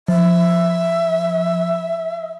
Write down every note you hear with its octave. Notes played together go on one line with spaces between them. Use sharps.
F3 E5